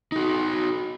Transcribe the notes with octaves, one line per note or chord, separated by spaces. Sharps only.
D#4 F#4